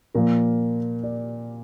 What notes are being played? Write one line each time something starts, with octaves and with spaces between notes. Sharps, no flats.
A#2 F3 A#3 A#4
D5